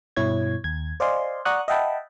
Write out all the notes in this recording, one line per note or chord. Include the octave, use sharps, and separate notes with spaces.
G2 B2 E4 C#5 G#6
D#2 G#6
C5 D5 D#5 F5 G#5 C6
D5 F#5 A#5 C#6 D#6 F#6
D#5 E5 F#5 G5 A5 B5